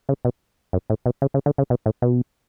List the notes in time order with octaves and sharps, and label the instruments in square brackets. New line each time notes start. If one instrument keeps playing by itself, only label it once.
[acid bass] C#3
B2
F#2
A2
B2
C#3
C#3
D3
C#3
B2
A2
B2